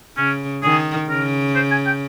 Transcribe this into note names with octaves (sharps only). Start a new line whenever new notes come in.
C#3 C#4
D#3 G#4
C#3 A#4
C5
G#5
G5